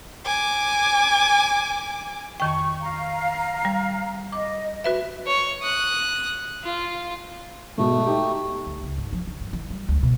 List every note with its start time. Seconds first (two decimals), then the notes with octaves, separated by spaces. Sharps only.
0.25 G#5 D6
2.40 F2 D#3 G5 C#6
2.81 F5 A#5
3.65 G3
4.32 D#5 D6
4.84 F#4 B4 E5 B5
5.26 C#5
5.62 D#6 F#6
6.63 F4
7.78 G#2 B2 A3
8.06 D#4 G4
8.67 D2
8.83 C#2
8.98 G#2
9.13 F3
9.27 D3
9.41 G2
9.53 E3
9.70 G3
9.88 D2
10.03 B2